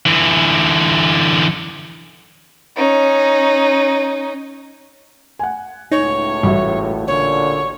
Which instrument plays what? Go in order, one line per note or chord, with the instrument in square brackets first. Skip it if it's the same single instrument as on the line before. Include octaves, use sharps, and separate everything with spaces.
[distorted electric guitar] D3 E3
[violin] C#4 D#4
[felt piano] F#5 G#5
[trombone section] C#2 A2 [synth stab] D#4 [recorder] C#5
[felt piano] A1 F#4 E5 [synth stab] G3
[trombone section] A#2 D3 [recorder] C#5